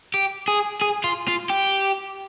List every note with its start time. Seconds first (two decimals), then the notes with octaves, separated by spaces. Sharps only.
0.14 G4
0.48 G#4
0.81 G#4
1.04 F4
1.28 F4
1.50 G4